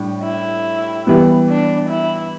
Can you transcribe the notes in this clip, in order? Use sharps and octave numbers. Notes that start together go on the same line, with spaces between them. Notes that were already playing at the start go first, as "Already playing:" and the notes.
Already playing: A2 G3 D4
E4
E3 G3 B3
D4
E4